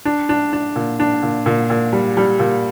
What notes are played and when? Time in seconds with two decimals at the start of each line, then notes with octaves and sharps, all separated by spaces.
0.05 D4
0.29 D4
0.53 D4
0.76 A#2
1.00 D4
1.23 A#2
1.46 A#2
1.70 A#2
1.93 G3
2.17 G3
2.40 A#2